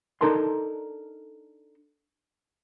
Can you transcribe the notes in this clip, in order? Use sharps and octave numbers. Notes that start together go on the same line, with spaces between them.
D4 D#4 A4 A#4 A5 C6